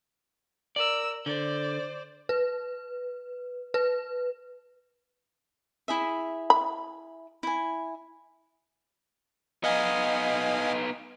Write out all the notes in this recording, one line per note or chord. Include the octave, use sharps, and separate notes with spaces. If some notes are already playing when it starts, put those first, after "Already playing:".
A#4 D5 E6
D3 C5 D5
B4
B4
E4 G#4 E5
B5
E4 G#5
B3 D#4 D#5 F5 G#5